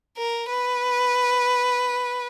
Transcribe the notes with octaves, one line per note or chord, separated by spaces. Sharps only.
A#4
B4